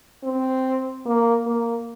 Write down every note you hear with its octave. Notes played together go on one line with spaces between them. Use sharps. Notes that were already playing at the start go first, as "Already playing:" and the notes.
C4
A#3
A#3